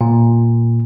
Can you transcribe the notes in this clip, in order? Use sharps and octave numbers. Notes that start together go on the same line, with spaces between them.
A#2